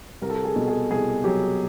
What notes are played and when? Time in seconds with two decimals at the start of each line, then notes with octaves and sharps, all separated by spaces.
0.22 C2 A#4
0.30 A4
0.36 A#4
0.45 G#4
0.56 B2 A4
0.68 G#4
0.91 C2 G#4
1.24 F#3 G4